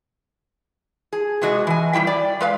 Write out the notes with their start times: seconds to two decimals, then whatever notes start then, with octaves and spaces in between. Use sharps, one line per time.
1.13 G#4
1.42 C3 G#3 F#4 G#4 D#5
1.67 E3 G#5
1.93 G3 A#3 E4 G5
2.07 D5
2.41 G#3 B4 F5